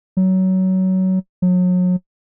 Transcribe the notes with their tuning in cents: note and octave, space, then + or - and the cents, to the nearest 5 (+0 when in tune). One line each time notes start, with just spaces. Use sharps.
F#3 +20
F#3 -35